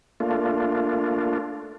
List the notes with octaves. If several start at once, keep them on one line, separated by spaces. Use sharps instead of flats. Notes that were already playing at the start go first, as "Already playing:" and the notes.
A3 A#3 D4 F4